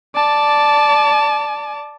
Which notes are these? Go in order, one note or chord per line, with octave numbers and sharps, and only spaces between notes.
D5 A5